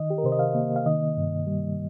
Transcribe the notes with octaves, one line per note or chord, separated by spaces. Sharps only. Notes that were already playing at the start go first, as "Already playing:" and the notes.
Already playing: D#3 D#5
G4
A#4
C3 C5
D#5
F5
A#3
F5
D#3 D#5
G2
G3